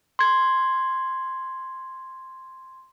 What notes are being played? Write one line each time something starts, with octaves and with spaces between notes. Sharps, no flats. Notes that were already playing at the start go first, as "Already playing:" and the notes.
C6 G#6